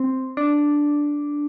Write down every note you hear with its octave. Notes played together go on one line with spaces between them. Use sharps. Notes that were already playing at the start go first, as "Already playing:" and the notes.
Already playing: C4
D4